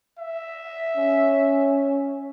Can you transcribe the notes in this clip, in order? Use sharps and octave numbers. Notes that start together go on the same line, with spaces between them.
E5
C#4